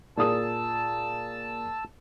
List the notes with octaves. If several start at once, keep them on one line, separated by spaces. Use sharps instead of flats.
A#2 G#4 A5 D#6 E6